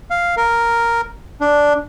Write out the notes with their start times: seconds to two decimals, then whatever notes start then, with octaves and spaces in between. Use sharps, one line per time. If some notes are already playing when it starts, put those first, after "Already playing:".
0.10 F5
0.37 A#4
1.41 D4